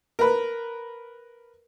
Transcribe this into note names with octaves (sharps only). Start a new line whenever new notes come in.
A#4 B4